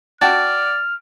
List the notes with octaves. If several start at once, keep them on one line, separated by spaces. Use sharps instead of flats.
F#4 D5 G5 A5 F6 A6